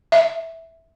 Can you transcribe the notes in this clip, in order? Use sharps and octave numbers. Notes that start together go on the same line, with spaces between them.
E5